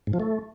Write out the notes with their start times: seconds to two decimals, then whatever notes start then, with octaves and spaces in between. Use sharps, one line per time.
0.07 G#2
0.13 F3
0.20 A3